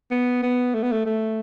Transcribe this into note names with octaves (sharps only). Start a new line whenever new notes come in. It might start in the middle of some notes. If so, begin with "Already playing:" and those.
B3
B3
A3
B3
A3
A3